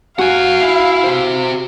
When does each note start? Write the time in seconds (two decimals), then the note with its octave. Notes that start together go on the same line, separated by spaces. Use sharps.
0.19 F#4 F5 F#5 G#5
0.61 E4
1.04 G4 C5